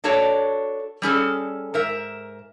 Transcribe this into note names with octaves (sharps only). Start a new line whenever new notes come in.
D4 F#4 A4 C#5 D5
G3 C#4 G#4 A4
G#2 A#4 E5